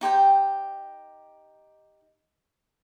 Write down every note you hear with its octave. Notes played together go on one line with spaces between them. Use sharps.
D#4 G4 C5 G5